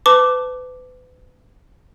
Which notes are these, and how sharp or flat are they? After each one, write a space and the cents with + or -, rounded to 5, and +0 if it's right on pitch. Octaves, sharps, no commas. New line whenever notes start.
B4 +35 A5 +0 D6 +0